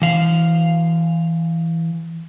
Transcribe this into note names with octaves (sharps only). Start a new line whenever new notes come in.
E3 F5